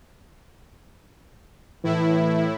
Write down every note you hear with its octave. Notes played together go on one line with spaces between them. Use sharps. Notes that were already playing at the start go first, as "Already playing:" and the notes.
A2 E3 E4